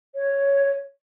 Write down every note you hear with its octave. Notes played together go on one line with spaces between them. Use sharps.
C#5